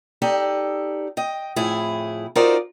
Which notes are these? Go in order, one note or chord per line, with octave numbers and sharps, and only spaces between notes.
D#4 G4 A4 D5
D#5 G5
F2 A2 E4 G#4
D#4 F4 F#4 A#4 C5 D5